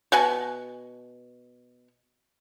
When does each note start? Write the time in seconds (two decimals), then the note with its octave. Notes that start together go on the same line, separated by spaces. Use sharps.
0.12 B2 F#5 G#5